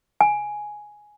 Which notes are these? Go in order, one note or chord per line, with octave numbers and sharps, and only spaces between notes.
G#5